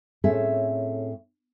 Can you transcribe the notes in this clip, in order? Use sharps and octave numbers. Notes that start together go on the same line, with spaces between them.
A2 C4 C#4 G#4 A4 E5